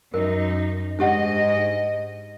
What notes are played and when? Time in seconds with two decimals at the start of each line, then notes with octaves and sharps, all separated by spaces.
0.14 F#2 D#4 A#4
0.99 G#2 D4 G4 D#5 F#5